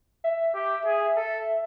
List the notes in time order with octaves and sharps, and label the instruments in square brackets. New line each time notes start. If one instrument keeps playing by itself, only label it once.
[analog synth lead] E5
[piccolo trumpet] G4
G#4
A4